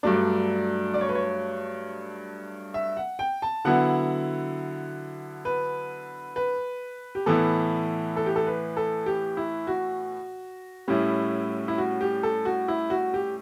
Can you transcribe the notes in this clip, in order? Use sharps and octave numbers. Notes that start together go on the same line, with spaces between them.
G2 F#3 A3 D4 D5
D5
C#5
B4
C#5
E5
F#5
G5
A5
D3 F#3 B3 E4 F#5
B4
B4
G4
A2 E3 B3 E4 A4
A4
G4
A4
B4
A4
G4
E4
F#4
A2 G3 C#4 E4
E4
F#4
G4
A4
F#4
E4
F#4
G4